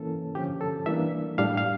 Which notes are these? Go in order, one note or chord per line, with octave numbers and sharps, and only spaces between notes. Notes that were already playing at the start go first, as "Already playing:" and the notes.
Already playing: E3 A#3 C#4 A4
D3 F3 C#4 G4
A4
E3 G3 A#3 D4 E5
A2 G3 D4 F5
F5